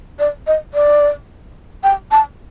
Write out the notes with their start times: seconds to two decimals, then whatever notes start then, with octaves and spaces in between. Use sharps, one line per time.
0.19 D5
0.47 D#5
0.74 D5
1.83 G5
2.11 A5